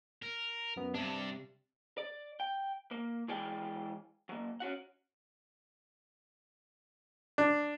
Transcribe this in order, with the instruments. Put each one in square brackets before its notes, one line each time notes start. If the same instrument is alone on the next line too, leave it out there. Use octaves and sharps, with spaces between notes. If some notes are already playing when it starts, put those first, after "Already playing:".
[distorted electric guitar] A#4
[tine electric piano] F#2 B3
[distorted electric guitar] G2 D4 [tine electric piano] C3
[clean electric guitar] D5
G5
A#3
E3 G#3 G#4 D5 G5
F#3 A#3
C#4 F#4 F#5
[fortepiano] D4